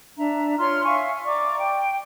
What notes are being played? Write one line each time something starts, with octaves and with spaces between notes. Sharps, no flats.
D4 E5 A#5
F4 C#5 C6 F6
E5 F5 G#5 C#6
D5 A#5 C#6 D6
G5